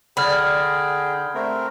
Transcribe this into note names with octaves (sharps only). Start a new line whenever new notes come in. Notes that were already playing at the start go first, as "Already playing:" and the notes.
D3 G#4 G5 B5 F6
A3 C4 A#4